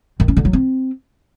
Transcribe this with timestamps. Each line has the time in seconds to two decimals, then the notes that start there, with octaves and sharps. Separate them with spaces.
0.20 D#3
0.28 C#4
0.37 D3
0.45 F#3
0.53 C4